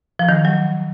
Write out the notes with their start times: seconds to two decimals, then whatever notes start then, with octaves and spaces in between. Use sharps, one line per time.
0.19 F3
0.29 D#3
0.45 F#3